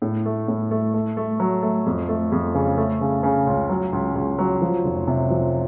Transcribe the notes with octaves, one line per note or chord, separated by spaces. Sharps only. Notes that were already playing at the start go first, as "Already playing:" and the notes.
A2
A3
A2
A3
A3
A3
F#3
A3
F2
A3
F2
C#3
A3
C#3
C#3
C#2
F#3
C#2
C#2
F#3
F3
F1
C3
F3